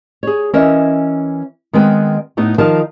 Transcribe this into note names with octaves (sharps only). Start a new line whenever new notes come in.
G#4 C#5
E3 C#4 A#4 C#5 D#5 E5
D#3 G#3 B3 C4 B4 G5
A2 A3 B3 D#4
D#3 F3 D#4 A#4 F5 A5